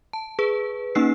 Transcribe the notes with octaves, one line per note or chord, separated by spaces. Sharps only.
A5
G#4 B4
A#3 C#4 D#4 E6 C7